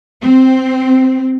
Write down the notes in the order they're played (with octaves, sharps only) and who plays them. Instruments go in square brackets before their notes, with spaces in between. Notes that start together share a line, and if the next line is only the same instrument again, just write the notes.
[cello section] C4